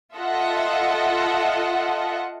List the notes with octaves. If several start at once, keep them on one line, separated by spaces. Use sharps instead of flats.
F4 A4 D#5 E5 F#5